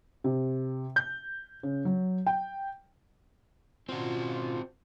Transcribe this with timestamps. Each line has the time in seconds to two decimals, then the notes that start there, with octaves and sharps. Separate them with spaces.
0.24 C3
0.96 G6
1.63 C#3
1.85 F#3
2.26 G5
3.89 B2 C4 C#4 F4 F#4